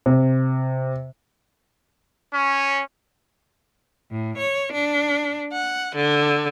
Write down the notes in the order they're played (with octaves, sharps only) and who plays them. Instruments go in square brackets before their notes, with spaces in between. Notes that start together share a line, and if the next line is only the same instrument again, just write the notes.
[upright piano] C3
[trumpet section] C#4
[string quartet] A2
C#5
D4
F#5
D3